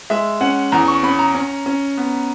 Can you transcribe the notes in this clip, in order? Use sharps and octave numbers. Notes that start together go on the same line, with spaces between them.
G#3 E5
C#4 F#5
E2 A#5
C#6
C#4 B5
A#5
C#4
C#4
B3